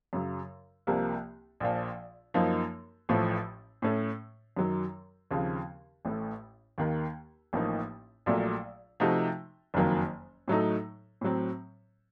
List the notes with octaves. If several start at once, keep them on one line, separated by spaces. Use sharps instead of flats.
F#2 C#3 F#3
C2 C3 F3 A#3
A#1 A#2 F3
F#2 F3 A#3 D#4
A1 A2 F3 A3
A2 A3 C#4
F#2 D#3 F#3
D#2 C#3 F3 C4
A1 A2 A3
D#2 D#3 A#3
A1 A2 F3 A#3 D#4
A#1 A#2 F#3 A3
C3 F3 A3 D#4 F#4
F#1 F2 D#3 F#3 A#3
A2 F#3 A3 D#4 A4
A2 F#3 C4